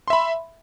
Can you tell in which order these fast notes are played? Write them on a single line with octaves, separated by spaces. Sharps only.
C6 E5 B5